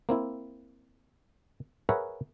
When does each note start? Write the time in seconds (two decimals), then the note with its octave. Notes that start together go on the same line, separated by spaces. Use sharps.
0.09 A#3 C4 E4
1.89 G#4 A#4 B4 C#5 E5 F#5